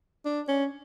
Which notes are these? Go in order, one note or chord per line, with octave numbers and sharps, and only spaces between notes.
D4
C#4